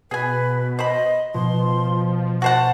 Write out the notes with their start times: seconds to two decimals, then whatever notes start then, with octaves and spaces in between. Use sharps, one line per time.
0.11 B2 G#4 B4 G#5
0.79 C5 D#5 B5
1.34 B2 F3 C6
2.42 F#4 C5 F#5 A5